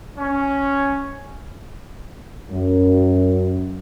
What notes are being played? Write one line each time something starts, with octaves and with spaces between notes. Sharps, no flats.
C#4
F#2